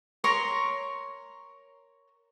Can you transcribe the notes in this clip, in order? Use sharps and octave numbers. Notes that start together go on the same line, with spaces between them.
A#4 C#5 A#5 C6